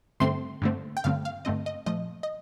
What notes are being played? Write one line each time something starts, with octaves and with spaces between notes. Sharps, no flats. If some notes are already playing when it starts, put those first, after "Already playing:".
G2 D3 A3 C4 C6
G2 D3 A3 C4
G5
G2 D3 A3 C4 F5
F5
G2 D3 A3 C4 D#5
D#5
A#2 F3 A3 D#5
D#5